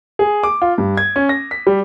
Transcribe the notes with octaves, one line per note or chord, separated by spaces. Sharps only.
G#4
D6
F4
G2
G#6
C#4
A#6
B6
G3